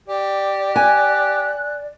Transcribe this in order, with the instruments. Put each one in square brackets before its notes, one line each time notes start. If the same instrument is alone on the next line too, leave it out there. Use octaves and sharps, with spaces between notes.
[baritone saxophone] G4 [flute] D5
[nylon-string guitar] G#5 [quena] F#6